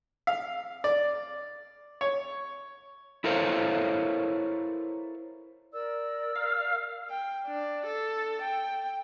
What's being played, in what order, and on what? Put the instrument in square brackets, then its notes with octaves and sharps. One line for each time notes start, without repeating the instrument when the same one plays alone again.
[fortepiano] F5
D5
C#5
[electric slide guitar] E4 A4 A#4 C5 C#5 F5
[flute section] A#4 D5 E6
[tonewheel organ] F5
[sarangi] G5
D4
A4
G5